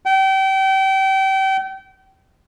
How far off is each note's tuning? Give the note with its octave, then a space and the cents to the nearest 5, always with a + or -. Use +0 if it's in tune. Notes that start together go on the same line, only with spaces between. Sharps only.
G5 -30